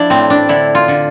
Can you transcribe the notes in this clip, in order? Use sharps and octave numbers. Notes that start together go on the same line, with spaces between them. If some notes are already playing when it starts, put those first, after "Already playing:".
Already playing: F3 D4 E4
A2 C4
D4
D3 E4
F4
D3